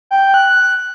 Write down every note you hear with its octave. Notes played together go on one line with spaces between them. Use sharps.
G5
F#6